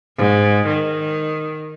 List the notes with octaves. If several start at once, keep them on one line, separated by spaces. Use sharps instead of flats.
G#2
D#3